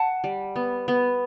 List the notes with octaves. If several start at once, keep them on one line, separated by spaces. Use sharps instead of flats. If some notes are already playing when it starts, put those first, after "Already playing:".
Already playing: F#5 A5
G3
B3
B3